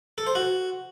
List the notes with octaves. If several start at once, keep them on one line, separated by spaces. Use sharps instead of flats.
A4
C5
F#4